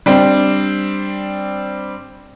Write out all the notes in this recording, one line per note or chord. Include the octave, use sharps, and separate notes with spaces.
G3 C4 D4